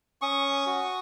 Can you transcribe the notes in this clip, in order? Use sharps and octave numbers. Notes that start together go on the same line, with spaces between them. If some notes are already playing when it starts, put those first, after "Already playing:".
C#4 C#6 D#6
F#4